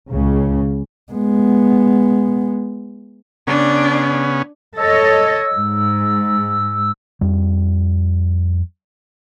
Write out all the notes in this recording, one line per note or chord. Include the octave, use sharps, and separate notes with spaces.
C#2 C#3
G#3 B3
C#3 B3 C#4 D4
A4 C#5 D#5 E6
G#2
F2 G3